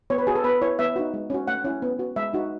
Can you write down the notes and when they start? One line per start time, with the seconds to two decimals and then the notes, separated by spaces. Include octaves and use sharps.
0.10 B3 C#5
0.18 B4
0.27 F#4 G#4
0.35 A4
0.44 B3 B4
0.61 E4 C#5
0.79 B3 E5
0.96 D#4 F#4
1.14 G#3
1.30 C#4 F#4
1.47 A3 F#5
1.64 C#4 E4
1.82 B3
1.99 F#4
2.16 G#3 E5
2.33 D#4 F#4